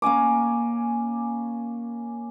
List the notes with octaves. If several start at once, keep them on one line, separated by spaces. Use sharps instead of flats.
A#3 C#4 G#5 D6